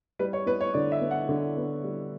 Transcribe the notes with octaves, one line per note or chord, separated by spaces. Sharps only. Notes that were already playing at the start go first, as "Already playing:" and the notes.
G3 B4
C#5
B3 B4
C#5
D3 D5
E5
B3
F#5
D3
B3
G3